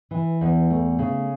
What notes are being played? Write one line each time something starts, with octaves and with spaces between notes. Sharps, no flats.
E3
E2
A3
C#3